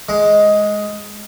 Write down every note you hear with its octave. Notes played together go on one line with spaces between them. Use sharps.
G#3